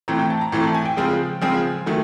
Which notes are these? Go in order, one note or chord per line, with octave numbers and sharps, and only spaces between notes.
A2 E3 A3 C4 A#5
G5
A5
A#5
A2 E3 A3 C4 A#5
A5
G#5
G5
C#3 F3 G#3 C4
C#3 F3 G#3 C4 G#5
D#3 F#3 A3